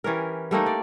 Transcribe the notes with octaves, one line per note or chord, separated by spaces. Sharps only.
E3 C#4 G4 A#4
G3 A3 A#3 D#4
D5